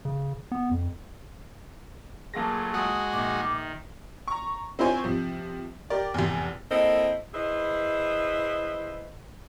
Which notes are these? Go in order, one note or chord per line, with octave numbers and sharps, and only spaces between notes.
C#3
B3
F2
F#3 A3 A#3 F4 G#4 A5 A#6
G#3 F#4 D#6
A#1 D#3 D6
A#5 C#6
C4 E4 F4 C5 C#5 G#5
C3 F3
G4 A#4 D5
F1 E2
A#3 C4 E4 A4 D#5
E4 G#4 B4 C5 D#5 E5